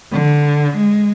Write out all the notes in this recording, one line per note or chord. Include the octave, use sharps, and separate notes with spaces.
D3
G#3